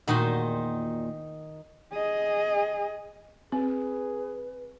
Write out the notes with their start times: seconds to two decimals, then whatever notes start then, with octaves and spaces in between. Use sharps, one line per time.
0.08 E2 A#2 D#3 D#4 F#4 C5
1.93 G#4 D#5
3.52 C4 G#4 B4